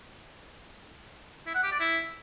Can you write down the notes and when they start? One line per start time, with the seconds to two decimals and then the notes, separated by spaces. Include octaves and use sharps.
1.47 E4
1.55 F#5
1.63 G4
1.72 D5
1.80 E4